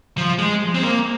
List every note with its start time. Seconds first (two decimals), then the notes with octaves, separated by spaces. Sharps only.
0.17 F3
0.39 G#3
0.75 C4
0.83 A#3